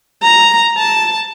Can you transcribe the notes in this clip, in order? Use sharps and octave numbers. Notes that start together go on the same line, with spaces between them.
A#5
A5